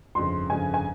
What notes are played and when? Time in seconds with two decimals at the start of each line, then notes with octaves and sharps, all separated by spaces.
0.15 G1 F2 C#3 C6
0.50 G1 F2 C#3 G#5
0.74 G#5